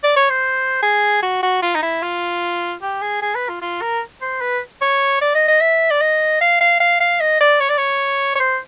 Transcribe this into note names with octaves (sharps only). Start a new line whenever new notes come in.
D5
C#5
C5
G#4
F#4
F#4
F4
D#4
E4
F4
G4
G#4
G#4
B4
F4
F4
A#4
C5
B4
C#5
D5
D#5
D#5
E5
D5
D#5
F5
F5
F5
F5
D#5
D5
C#5
D5
C#5
C#5
C5